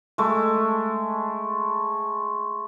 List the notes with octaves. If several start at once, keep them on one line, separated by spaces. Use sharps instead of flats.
G#3 A3